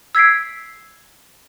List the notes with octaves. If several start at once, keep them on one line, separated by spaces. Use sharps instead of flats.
E6 G#6 B6 C7 D7